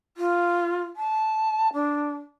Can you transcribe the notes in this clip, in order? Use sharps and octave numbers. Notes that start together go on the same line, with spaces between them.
F4
A5
D4